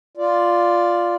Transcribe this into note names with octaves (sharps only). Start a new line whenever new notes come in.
F4 D5